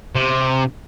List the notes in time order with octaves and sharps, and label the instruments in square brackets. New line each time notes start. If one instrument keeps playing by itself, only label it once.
[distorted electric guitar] C3